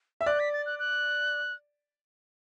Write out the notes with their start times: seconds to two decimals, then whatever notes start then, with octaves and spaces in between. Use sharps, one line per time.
0.21 E5 E6
0.26 D5 F#6
0.40 B6
0.53 A6
0.66 F#6
0.79 F#6